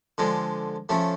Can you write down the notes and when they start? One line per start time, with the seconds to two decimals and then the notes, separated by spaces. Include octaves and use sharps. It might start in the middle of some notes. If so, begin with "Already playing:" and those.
0.18 D3 F3 G#3
0.89 C#3 F3 A3